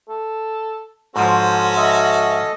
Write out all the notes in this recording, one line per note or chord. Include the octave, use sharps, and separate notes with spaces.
A4
G#2 F3 C#4 F#4 A4
A4 D#5 E5